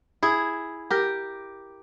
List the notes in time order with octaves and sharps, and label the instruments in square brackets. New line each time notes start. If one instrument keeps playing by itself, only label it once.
[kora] E4 G#4
G4 A#4